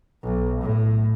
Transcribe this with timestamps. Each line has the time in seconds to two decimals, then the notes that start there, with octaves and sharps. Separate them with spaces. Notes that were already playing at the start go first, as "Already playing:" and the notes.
0.23 B1
0.62 A2